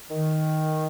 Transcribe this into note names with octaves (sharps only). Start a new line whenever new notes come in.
D#3